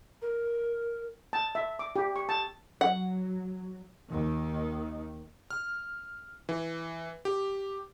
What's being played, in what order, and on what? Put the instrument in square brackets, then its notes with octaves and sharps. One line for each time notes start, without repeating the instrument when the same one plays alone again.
[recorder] A#4
[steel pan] A5
E5
D6
G4
C#6
A5
[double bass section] F#3 [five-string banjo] F#5
[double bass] D#2 D#3
[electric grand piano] F6
E3
G4